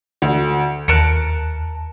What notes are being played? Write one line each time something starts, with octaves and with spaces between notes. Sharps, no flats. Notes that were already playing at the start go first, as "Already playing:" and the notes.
D2
D#2 A#4 A5 F#6 C#7 D7